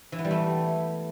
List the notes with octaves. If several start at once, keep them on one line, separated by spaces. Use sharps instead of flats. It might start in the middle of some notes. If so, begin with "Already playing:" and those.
E3
B3
G3
A3